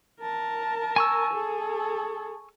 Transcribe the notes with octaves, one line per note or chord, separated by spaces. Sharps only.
A#4 A5
G#5 C#6 E6
G#4 A4